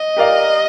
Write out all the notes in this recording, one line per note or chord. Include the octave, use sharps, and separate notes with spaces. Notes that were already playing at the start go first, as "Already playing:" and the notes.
Already playing: D#5
G4 A#4 D5 F5